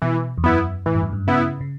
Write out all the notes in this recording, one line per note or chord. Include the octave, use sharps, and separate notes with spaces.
B2 E3
E2
F#2 B3 E4
A2 E3
G2
F#2
G2
C#3 B3 E4
C#3